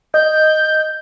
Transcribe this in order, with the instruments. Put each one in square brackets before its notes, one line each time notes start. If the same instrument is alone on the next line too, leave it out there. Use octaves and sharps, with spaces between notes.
[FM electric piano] D#5 [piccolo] G6